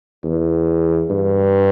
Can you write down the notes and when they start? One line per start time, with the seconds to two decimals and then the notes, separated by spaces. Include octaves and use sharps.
0.24 E2
1.10 G2